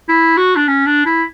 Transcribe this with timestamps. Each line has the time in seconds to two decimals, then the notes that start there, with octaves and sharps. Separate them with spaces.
0.09 E4
0.37 F#4
0.56 D4
0.67 C#4
0.86 D4
1.06 E4